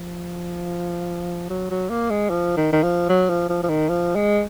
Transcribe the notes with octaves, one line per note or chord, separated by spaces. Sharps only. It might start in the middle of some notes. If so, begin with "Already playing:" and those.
Already playing: F3
F#3
F#3
A#3
G#3
F3
D#3
D#3
F3
F#3
F3
F3
F3
D#3
F3
G#3